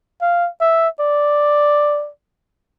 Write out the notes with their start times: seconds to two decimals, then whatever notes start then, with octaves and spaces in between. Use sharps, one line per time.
0.22 F5
0.61 E5
1.00 D5